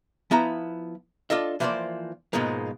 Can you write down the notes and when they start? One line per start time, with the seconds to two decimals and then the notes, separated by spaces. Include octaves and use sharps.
0.31 F3 B3 E4 A#5
1.30 D4 F4 A4 D#5 E5
1.60 E3 F3 A#3 A4 C5 D5
2.33 G#2 B2 F3 G#3 A#3